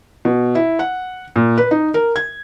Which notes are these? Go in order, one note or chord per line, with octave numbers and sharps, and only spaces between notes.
B2
E4
F#5
A#2
B4
D#4
A#4
G#6